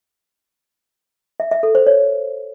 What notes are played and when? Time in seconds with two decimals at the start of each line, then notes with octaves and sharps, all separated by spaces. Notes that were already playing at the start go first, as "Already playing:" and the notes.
1.40 E5
1.51 E5
1.63 A4
1.75 C5
1.87 C#5